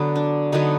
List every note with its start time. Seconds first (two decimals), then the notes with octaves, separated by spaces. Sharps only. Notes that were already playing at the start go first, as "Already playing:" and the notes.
Already playing: D3 F#3 B3
0.16 D4
0.52 D3 F#3 B3 D#4